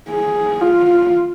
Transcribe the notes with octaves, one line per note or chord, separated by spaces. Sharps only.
G#4
F4